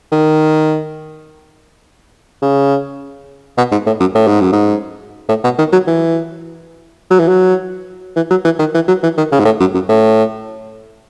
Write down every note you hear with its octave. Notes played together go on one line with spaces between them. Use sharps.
D#3
C#3
B2
G#2
A2
F#2
A2
G#2
F#2
G#2
A2
B2
D#3
F#3
E3
F#3
E3
F#3
E3
F#3
E3
D#3
E3
F#3
E3
D#3
C#3
G#2
A2
F#2
F#2
A2